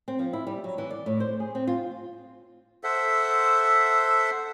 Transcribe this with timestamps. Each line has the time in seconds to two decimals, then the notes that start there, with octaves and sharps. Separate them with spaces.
0.08 C4
0.19 F3
0.33 E4
0.47 G3
0.64 F#3
0.78 E3
0.91 D5
1.06 A2
1.20 C5
1.40 G#4
1.55 C4
1.67 F4
2.84 A4 C5 E5 F#5